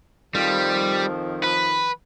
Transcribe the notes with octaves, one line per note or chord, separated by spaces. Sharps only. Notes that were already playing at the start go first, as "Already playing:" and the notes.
F2 D#3 F3 G3
B4